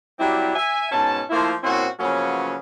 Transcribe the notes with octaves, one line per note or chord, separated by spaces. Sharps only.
F#3 G3 C4 E4 G4
E5 G#5
G#2 B2 C#4 A5
F3 A3 A#3 E4 F4 C5
A#2 C4 C#4 E4 F#4 C5
C#3 F3 F#3 A#3 B3 C#4